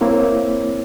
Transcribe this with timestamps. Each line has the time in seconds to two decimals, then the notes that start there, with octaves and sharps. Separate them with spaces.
0.01 A#3 C4 E4 C#5